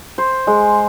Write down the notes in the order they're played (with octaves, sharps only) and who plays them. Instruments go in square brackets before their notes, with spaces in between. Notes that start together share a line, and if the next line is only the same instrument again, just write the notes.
[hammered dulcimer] C5
G#3